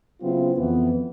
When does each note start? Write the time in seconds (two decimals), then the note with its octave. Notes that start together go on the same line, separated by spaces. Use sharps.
0.22 C#3 F#3 B3 C4 E4 F4
0.58 F2 E3 B3